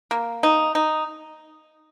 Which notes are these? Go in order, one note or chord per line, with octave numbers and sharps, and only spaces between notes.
A#3
D#4
D#4